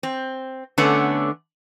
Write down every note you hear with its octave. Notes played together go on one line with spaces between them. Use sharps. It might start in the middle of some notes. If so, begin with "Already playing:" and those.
C4
D3 A3 B3 C#4 D4